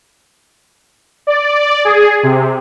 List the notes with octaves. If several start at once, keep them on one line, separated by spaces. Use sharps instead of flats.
D5
G#4
C3